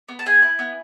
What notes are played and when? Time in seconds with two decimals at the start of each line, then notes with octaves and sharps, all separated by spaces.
0.08 B3
0.19 A5
0.26 G#4 G#5
0.42 E4
0.59 B3